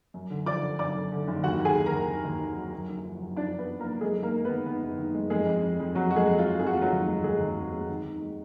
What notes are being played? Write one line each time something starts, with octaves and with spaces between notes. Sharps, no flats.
F#2
D3
F3 D5 D6
D3
F#2 D5 D6
D3
D3
F#1
D#2 F#4 F#5
D#2
G#4 G#5
D#3
A#4 A#5
D#2
D#3
D#2
D#3
F#3
F#2
F#1
F3
F#2
F3 D4 D5
F3
B3 B4
F3
A#3 A#4
F#1
F#2 G#3 G#4
D#3
A#3 A#4
G#3
B3 B4
D#3
D#3 B3 B4
F#1
D#3
G#3
F2 G#3 G#4
F2
F2
F2
F2 F#3 F#4
F2 F#4
G#3 G#4
F2
F4
F#3
F1 G#4
F#4
G#3 F4
F#3 F#4
D#2
G#3
D#2 G#3 G#4
D#2
F1
G#3
D#3
D#3
G#3